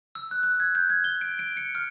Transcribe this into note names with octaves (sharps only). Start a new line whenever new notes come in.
E6
F#6
F#6
G#6
G6
G#6
G7
D7
D7
C#7
F6